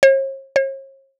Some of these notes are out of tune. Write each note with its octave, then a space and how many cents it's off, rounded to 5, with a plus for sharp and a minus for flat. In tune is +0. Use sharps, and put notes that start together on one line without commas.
C#5 -45
C#5 -45